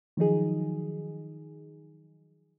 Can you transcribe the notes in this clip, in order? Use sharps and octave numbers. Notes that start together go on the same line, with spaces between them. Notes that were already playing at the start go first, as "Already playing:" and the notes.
D#3 F3 F#3 D#4 G#4